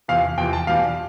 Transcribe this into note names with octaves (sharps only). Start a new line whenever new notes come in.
E2 C3 F3 F5
E2 C3 F3 G5
A5
E2 B2 G3 F5